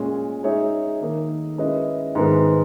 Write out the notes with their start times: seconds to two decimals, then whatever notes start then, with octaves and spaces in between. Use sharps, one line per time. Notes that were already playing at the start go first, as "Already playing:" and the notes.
Already playing: A#2 G#3 C#4
0.43 G#3 D#4 G#4 C#5 E5
1.01 D#3 A#3 D#4 A#4
1.58 G#3 C#4 E4 B4 D#5
2.15 G#2 D#3 G#3 B3